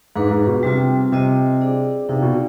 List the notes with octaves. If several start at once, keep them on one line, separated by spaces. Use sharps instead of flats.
G#2 D4 G#4 B4
G#2
B2
C3 G3 C4 F4
C3 C4 F4 C5 D#5
D4 G#4 D5
C3 D#4 B4 D5 F5
B2